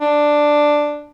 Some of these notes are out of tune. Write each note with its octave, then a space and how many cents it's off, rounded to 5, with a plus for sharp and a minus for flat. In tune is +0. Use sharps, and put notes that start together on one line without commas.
D4 +5